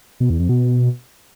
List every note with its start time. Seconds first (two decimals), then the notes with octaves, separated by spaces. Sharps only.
0.20 B2
0.30 E2
0.40 F2
0.49 B2